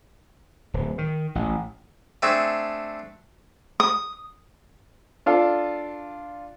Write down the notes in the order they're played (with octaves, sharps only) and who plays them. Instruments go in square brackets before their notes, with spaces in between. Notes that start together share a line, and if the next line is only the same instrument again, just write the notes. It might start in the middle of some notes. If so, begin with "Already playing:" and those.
[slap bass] D1
D#3
A1
[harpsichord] A3 C4 D4 G#4
[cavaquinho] D#6
[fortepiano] D4 F4 A4